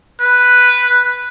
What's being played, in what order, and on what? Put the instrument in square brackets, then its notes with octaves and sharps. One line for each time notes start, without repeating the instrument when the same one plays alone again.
[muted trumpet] B4